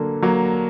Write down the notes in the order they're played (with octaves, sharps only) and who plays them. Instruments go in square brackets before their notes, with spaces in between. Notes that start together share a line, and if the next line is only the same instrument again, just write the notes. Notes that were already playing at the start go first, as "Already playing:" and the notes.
Already playing: [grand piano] D3 F#3 A#3
F#3 A#3